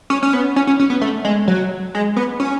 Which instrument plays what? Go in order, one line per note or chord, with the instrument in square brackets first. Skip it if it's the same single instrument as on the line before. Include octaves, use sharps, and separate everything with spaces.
[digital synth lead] C#4
C#4
B3
C#4
C#4
C#4
B3
A3
G#3
F#3
G#3
B3
C#4